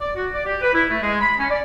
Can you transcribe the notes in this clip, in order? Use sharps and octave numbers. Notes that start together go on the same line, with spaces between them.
D5
F#4
D5
G4
B4
E4
A3
G#3
B5
C#4
D5